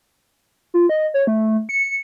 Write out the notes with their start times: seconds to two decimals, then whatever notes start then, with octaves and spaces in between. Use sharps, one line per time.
0.74 F4
0.89 D#5
1.14 C#5
1.27 A3
1.69 C#7